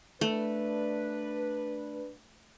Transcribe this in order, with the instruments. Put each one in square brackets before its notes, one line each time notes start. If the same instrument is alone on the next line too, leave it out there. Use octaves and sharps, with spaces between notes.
[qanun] A3 [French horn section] D4 B4